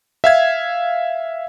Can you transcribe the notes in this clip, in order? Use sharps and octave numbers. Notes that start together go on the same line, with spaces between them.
E5 F5 G#6